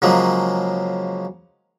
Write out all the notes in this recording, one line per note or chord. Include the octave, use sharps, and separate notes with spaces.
C#3 F3 F#3 G#3 A#3